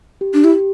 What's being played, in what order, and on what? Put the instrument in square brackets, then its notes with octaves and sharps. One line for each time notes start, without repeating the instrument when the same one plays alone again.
[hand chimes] G4
[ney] D4
[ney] E4 [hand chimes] G4